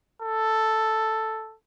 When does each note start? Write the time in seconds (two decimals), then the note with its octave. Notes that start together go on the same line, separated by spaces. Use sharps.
0.22 A4